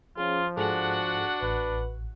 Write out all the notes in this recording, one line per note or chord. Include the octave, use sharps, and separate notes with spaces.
F3 C#4 F4 G#4
G#2 D4 F#4 G#4 A4 F#5
A1 B4